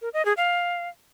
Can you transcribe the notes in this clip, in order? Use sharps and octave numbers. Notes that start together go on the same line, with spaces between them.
A#4
D#5
G#4
F5